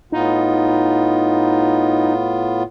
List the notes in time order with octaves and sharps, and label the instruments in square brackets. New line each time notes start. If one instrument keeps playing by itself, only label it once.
[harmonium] A2 B3 F4 [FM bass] D#4